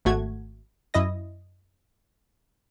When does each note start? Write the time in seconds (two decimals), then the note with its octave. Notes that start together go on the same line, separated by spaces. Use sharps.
0.05 G#1 A3 F#4 G#6
0.94 F#2 E4 D#5 A#6